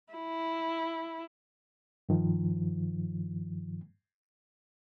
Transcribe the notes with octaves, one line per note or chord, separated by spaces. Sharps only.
E4
G2 D#3 F3